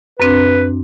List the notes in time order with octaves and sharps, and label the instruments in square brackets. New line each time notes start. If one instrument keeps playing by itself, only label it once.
[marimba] F#2 C4 D4 [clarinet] B4